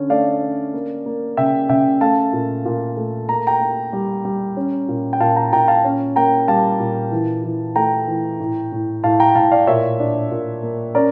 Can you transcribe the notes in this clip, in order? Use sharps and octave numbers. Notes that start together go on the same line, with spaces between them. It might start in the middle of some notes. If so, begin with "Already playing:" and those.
Already playing: D3 C#4
A3 D5 F5
C#4
A#3
A#3
C#3 E5 G5
C#3 E5 G5
A3 F5 A5
A#2
A#2
A3
A#3 A#5
G5 A#5
A#3
G3
G3
C#4
A#2
G5
A#2 F5 A5
G5 A#5
A#2 G5 A#5
F5 A5
C#4
A#3 G5 A#5
G3 F5 A5
A#2
E3
E3
A3 G5 A#5
E3
A2
A2
A2 F5 A5
G5 A#5
A2 F5 A5
D5 F5
A#2 C#5 E5
D4
A#2
A#3
C#4 A#4 D5